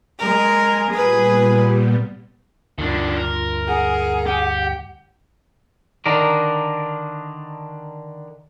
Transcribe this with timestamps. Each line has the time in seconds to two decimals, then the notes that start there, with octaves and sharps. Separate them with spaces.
0.19 G#3 A#4 G#5
0.92 A#2 G3 B3 G#4 B4
2.78 D2 G2 D#3 D4 F4
3.17 A#4
3.67 G#4 F#5
4.26 G4
6.06 D3 D#3 D4 A#4